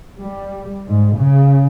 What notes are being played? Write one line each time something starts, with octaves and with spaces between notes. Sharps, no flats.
G3
G#2
C#3